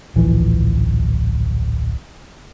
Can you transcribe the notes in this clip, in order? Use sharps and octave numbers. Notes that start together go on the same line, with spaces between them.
D1 A#1 E3 F3